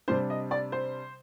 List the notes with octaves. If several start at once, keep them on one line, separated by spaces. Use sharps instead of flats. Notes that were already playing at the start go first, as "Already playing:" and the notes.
C3 G3 D4 C5
D#5
D5
C5